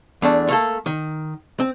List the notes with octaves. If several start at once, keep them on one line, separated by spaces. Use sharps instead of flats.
E2 A3 D4
A3 A#3 A4
D#3
C4